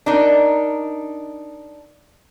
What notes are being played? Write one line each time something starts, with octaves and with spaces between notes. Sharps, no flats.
D4 D#4 A#4